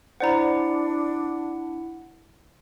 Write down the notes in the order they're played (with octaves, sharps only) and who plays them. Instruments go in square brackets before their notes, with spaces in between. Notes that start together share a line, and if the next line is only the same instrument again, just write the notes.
[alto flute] D4 [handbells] E4 F#5 [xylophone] C5 D5 A#5